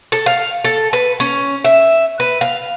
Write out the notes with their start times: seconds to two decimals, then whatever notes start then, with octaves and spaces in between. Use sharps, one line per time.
0.12 A4
0.26 F5
0.65 A4
0.93 B4
1.20 C#4
1.65 E5
2.20 B4
2.41 F5